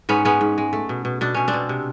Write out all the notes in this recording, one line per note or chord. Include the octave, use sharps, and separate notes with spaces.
G#2 B3 C#4
G#3 B3 C#4
G#2
G#3
A3
B2
B2
B2 D4
B2 C#4
C4 D4
B2
C3